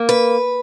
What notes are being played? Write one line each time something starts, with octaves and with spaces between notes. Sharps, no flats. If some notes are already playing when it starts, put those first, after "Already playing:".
Already playing: A#3
B4